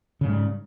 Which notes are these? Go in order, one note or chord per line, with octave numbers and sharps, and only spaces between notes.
G#2 C#3 G3